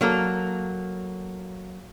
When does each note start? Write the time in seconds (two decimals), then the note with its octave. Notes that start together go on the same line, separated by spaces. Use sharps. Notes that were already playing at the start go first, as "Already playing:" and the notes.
0.01 F#3 A#3 A4